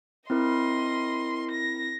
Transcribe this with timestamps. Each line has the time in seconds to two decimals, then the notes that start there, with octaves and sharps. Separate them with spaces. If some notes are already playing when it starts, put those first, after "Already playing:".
0.30 C4 E4 A#4 D#5 C6
1.52 A#6